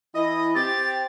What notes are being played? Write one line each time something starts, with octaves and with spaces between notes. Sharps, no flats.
E3 E4 D#5
C4 G4 A6